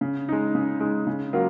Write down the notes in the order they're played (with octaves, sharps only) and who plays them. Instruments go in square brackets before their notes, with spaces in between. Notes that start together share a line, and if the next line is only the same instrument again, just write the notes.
[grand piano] C#3
G#3 D#4
C#3
G#3 D#4
C#3
F#3 A#3 F4 A#4